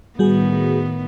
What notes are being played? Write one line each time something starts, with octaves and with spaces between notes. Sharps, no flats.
A2 D#3 G3 B3 F#4 G#4